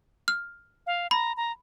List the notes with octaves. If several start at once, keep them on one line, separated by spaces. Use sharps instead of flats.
F6
F5
A#5 B5
A#5